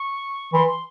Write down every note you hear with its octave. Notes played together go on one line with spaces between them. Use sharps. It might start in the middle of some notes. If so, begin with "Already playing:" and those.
Already playing: C#6
E3 C6
C6